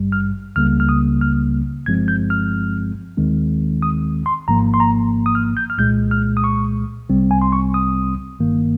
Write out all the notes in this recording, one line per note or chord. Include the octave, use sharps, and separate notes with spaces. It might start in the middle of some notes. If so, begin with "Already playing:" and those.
Already playing: G#1 G2 G3
F6
C#2 C#3 G3 A#3 F6
F6
D#6
F6
G1 G2 F3 G#3 C4 G#6
G6
F6
D#2 D#3 G#3 C4
D#6
C6
G#1 G#2 F3 A#3 A#5
C6
A#5
D#6
F6
G6
F6
C2 A#2 G#3 G6
F6
D#6
C#6
C2 C3 G3 C4
G#5
C6
C#6
D#6
G1 G2 D#3 A#3